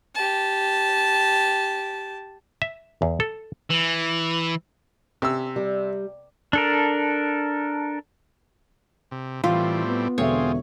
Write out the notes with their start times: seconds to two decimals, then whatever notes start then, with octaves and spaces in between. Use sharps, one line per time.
0.15 G4 A5
2.62 E5
3.02 E2
3.20 A4
3.70 E3
5.22 C3 C#4 E6
5.56 G3
6.53 D4 A4 A#4
9.11 C3
9.44 A2 E3 G3 C4 F4
9.86 B3
10.18 E1 D3 C4 F4 G#4 C#5 E5